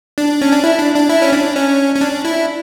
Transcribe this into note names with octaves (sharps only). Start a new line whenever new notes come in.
D4
C#4
D4
E4
D4
D4
E4
C#4
D4
C#4
C#4
D4
E4